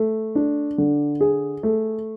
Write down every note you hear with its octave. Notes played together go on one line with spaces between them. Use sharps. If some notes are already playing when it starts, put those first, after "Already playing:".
Already playing: A3
D4
D3
G#4
A3